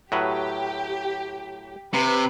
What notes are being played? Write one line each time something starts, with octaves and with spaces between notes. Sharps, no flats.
A2 F#3 G4 B4
C3 B4